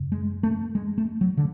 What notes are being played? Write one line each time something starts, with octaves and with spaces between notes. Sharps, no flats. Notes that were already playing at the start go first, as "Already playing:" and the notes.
Already playing: F#2 C#3
G#3
A3
G#3
A3
F#3
D3